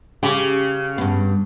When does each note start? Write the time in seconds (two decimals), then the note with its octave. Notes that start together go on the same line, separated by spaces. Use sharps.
0.23 C#3 G4
0.98 G2 B3